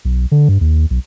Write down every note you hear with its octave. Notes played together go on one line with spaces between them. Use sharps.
B1
D3
G2
D#2
B1